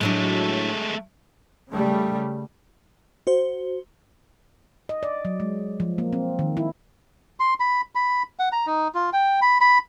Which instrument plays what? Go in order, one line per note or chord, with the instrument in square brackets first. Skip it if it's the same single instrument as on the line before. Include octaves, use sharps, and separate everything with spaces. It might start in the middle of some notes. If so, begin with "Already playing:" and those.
[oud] A2 F#3 D4 [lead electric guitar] G#3 A3
[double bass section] C#3 G3 A3
[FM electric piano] F#4 C5
[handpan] D#5
D5
F#3
G#3
F3
A#3
C4
D#3
E4
[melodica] C6
B5
B5
F#5
A#5
D#4
F4
G5
B5
B5